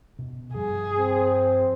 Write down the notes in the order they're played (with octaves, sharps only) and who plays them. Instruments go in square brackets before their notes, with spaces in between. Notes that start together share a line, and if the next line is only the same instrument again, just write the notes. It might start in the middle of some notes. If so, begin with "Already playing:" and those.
[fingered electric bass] B2
[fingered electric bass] G2 F3 G3 [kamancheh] G#4
[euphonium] C4